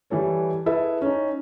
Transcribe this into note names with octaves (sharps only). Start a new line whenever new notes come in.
E3 G3 A4 C#5
E4 G#4 A4 B4 E5
C#4 D#4